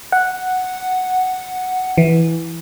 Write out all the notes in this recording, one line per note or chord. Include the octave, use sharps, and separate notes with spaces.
F#5
E3